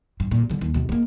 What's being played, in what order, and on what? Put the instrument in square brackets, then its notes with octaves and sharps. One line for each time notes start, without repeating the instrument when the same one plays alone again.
[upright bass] G2
A#2
D3 G3
D#2
D2 B2
G#3 A#3